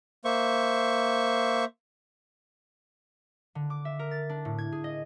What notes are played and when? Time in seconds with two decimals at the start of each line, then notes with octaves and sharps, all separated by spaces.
0.25 A#3 C5 E5 C#6
3.55 D3
3.70 D6
3.85 E5
3.99 A#4
4.11 A6
4.29 D4
4.45 A2
4.58 G#6
4.72 G#4
4.84 D#5